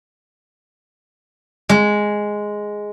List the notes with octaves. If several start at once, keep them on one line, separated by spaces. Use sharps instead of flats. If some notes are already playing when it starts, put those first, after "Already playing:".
G#3